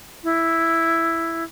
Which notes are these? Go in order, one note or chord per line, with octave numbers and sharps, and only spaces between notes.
E4